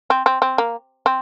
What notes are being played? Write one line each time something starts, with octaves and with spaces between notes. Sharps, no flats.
C4
C4
C4
A#3
C4